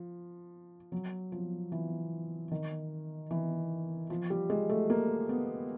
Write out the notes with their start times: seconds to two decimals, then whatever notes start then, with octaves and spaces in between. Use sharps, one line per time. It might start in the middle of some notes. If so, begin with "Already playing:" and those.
Already playing: F3
0.92 F#3
1.32 F3
1.72 E3
2.51 D#3
3.31 E3
4.10 F3
4.30 G3
4.50 G#3
4.69 A3
4.90 A#3
5.29 B3